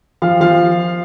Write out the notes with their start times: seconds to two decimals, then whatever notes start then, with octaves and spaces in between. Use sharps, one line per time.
0.22 F3 F5
0.41 F3 F5